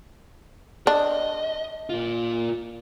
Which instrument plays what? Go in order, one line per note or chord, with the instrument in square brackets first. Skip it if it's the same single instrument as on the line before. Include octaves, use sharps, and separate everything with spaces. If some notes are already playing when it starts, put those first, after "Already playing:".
[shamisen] D4 [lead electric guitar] D#5
[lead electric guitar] A#2 F4